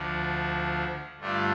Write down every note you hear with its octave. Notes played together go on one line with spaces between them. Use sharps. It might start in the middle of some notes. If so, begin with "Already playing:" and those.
Already playing: D2 D3 F3
G2 D3 A3 D4 F4